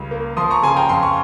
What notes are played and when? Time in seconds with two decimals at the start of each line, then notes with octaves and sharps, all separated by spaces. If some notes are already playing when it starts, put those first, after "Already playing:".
Already playing: C#2 C#3 G3
0.11 A#3
0.37 F3 C6 D#6
0.51 A#5 C#6
0.63 C#3 G#5 C6
0.76 G5 A#5
0.89 F2 C6
1.03 C#6